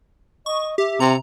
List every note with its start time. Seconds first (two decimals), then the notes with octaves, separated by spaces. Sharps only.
0.46 D#5 C#6
0.78 G4 E5
1.00 C3 A#5